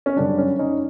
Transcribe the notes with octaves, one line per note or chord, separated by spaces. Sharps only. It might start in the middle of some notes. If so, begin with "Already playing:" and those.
C#4
F#2 D3 G3 D4
C#4
C#4 D#4